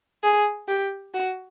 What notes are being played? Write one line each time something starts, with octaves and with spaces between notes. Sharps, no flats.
G#4
G4
F#4